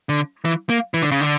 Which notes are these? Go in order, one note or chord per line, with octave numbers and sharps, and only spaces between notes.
D3
E3
A#3
E3
D3
C#3
D3